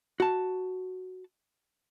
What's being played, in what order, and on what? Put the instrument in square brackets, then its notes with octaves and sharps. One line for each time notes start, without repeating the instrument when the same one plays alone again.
[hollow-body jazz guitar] F#4 A5